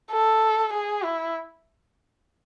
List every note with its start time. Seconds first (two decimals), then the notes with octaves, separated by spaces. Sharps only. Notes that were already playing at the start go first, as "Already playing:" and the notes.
0.11 A4
0.73 G#4
1.04 E4